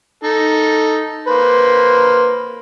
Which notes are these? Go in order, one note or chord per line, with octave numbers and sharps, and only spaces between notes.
D#4 A4
A#3 B4 C5